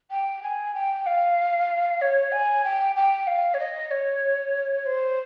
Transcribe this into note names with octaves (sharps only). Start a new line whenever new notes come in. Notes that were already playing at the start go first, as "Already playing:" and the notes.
G5
G#5
G5
F5
C#5
G#5
G5
G5
F5
C#5
D#5
C#5
C5